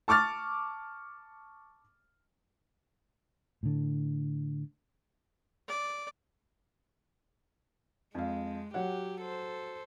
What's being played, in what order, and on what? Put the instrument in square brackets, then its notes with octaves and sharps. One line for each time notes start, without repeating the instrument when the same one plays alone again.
[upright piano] A5 C#6 D6 F6 A6
[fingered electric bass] A2 D3
[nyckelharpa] D5
[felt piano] F2 F5 [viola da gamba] G#3
[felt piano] F#3 C#5 F#5 [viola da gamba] G4
[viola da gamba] A4 C5